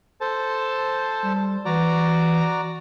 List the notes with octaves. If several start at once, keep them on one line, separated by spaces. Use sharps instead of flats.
A4 C5 A5
G3
E3 F#4 D5 A#5